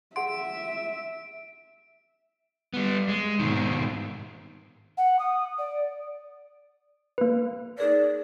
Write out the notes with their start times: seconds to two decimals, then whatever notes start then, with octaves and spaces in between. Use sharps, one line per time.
0.16 G#4 E5 F#5 C6 D7
2.74 G3 B3
3.09 G#3
3.39 G#2 B2 D#3
4.97 F#5
5.19 D#6
5.58 D5
7.18 A#3 B4
7.78 D#4 G#4 A#4 D5